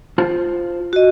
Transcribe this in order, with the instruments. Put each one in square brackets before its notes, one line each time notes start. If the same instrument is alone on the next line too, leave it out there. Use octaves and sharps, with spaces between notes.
[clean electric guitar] F4 C5 A5
[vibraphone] F#4 D#5